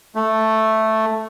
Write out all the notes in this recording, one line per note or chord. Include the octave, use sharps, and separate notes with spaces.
A3